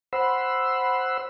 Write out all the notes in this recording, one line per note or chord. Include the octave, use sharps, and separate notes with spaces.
C5 F#5 B5 C6 E6